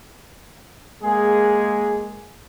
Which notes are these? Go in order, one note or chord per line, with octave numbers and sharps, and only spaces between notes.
G#3 A#3 G#4